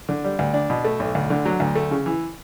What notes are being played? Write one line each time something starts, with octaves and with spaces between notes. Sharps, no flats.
D3
G3
D2
D4
B2
A3
B1
D2
D3
F#3
D2
A3
C#3
E3